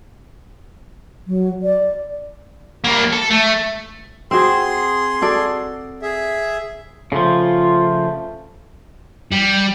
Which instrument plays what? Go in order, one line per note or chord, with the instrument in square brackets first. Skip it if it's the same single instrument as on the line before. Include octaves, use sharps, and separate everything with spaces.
[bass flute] F#3
D5
[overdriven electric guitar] G3 A#3
A4
A3
[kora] C4 F#4 [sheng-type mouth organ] G#4 C6
[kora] F#4 A4 D5
[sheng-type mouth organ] G#4 E5
[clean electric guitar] C#3 F3 [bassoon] A3 [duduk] F4
[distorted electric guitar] G3